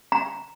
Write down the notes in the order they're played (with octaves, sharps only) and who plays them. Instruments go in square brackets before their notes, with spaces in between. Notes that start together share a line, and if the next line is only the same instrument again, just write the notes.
[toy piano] A#5